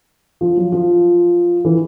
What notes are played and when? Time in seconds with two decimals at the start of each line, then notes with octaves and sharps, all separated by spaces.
0.41 F3
0.57 F#3
0.72 F3
1.65 E3